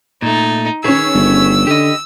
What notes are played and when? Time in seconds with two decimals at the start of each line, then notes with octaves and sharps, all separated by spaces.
0.22 A#2 A3 D#4
0.84 D#3 C#4 G#4 B4 C#5 E6
1.14 G1
1.67 D3 G4 D#5